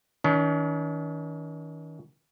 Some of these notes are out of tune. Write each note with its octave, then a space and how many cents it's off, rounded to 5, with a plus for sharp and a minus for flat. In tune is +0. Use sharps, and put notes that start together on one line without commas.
D#3 +35 C#4 +45